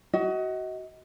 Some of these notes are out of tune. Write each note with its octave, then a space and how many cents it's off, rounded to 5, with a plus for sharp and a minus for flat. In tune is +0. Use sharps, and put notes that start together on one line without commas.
F#4 +20 D#5 +30